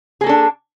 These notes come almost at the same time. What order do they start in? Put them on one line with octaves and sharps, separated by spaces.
G#4 A#3 A4 D4